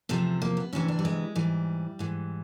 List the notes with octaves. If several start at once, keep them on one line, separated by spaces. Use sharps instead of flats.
E2 C3 F3 A3
A#3
B3
D2 C3 E3 C#4
D4
G3
G#3
G#2 E3 G3
G#2 E3